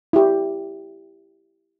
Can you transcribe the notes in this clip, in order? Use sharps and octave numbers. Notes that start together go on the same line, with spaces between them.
E4 G4